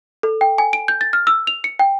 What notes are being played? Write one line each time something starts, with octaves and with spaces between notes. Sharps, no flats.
A4
G5
G#5
D7
G6
A6
F6
E6
F7
C#7
G5